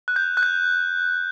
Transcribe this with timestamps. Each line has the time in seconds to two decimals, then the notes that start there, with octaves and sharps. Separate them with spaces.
0.08 F#6
0.16 G6
0.37 F#6
0.43 G6